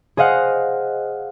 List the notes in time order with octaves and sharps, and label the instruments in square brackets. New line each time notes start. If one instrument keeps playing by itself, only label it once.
[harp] G#4 C5 D#5 F5 F#5